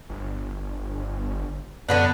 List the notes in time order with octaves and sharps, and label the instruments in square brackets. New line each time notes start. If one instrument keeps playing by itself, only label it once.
[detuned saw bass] G1
[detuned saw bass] F#2 [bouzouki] D3 B3 D4